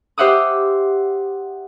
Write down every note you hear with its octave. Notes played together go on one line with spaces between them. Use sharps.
G4 C5 E5 F#5 D6 D#6